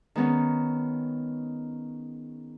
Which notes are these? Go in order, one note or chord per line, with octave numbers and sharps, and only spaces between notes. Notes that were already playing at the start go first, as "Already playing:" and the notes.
D#3 G#3 B3 C#4 D#4